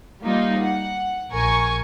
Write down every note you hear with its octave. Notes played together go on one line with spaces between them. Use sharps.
G3 A#3 D#4 F4
F#5
A#1 A#4 G#5 C#6